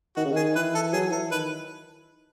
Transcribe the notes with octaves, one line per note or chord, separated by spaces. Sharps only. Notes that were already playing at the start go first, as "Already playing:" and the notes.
D#3 F#4
C#3
D#3 G#4
E3 B4
A4
F#3 G#4
E3 A4
D#3 B4